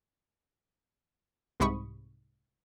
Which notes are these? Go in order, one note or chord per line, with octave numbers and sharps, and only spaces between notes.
C2 G#2 C3 B5 C#6 D#6